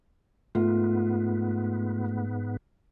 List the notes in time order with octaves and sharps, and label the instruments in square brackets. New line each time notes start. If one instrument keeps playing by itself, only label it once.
[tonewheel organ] G#2 B3 [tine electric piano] A3 [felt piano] F4